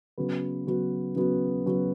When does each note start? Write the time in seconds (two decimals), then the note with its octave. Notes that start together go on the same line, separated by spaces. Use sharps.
0.18 C#3 F#3 B3 F#4 B4
0.67 C#3 F#3 B3 F#4 B4
1.16 C#3 F#3 B3 F#4 B4
1.66 C#3 F#3 B3 F#4 B4